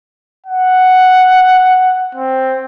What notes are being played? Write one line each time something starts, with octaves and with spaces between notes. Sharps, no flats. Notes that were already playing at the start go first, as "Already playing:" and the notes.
F#5
C4